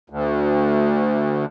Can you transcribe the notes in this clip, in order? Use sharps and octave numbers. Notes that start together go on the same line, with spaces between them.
D2